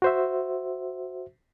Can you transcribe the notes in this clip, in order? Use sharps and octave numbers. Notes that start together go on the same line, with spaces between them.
F#4 C5 E5